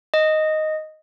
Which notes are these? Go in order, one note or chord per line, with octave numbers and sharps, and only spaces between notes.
D#5